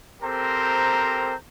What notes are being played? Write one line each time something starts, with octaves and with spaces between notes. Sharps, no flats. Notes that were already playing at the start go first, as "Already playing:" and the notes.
C4 G4 A4 A#4 C5 A#5